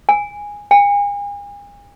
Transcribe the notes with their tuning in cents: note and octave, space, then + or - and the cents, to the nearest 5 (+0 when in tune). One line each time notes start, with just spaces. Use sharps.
G#5 -10
G#5 -40